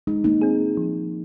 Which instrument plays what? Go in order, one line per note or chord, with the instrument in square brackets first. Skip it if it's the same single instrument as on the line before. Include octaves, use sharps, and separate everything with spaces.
[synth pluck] G#3 [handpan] D#4
[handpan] A#3 D#4
[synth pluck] C4 G#4
F3